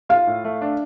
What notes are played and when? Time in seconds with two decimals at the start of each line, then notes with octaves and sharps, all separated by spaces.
0.09 F4 F5
0.27 A2
0.44 A3
0.62 D4